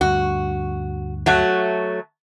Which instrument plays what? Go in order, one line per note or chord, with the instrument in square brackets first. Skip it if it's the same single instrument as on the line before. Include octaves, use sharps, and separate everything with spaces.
[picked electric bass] D2 G2 [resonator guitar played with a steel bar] F#4
[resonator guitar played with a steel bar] F#3 A3 F#4